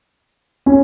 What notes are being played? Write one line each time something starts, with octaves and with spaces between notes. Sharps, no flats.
C#4